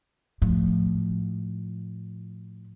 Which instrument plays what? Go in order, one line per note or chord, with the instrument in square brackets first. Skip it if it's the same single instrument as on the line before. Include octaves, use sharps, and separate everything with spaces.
[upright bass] A2 F3